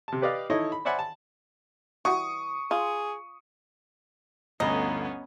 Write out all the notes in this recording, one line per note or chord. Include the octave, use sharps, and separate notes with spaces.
C3 A5
G4 B4 D5 D#5 F5
D#4 E4 A4 C#5 D#5
B5
C5 D5 E5 F#5 G#5 B5
A5
E3 G3 F#4 C#6 D#6
F4 G#4
G1 D2 B3 C#4 D#5 A#5 B5